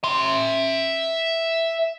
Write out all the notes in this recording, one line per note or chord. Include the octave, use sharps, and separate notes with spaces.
E5 C6